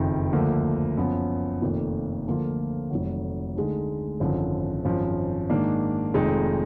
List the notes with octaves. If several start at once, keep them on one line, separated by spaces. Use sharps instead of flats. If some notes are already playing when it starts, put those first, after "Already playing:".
Already playing: F#1 F2 D#3
D2 D3 F3 A#3
F#2 F3 B3
F1 F2 D#3 A#3 F4
D2 D3 F3 A#3 F4
F1 F2 D#3 F#3
D2 D3 G#3 D#4
G#1 F#2 D3 F3
G#1 F#2 F3
G#2 D#3 A#3 D4
F1 F2 D#3 G#3 D#4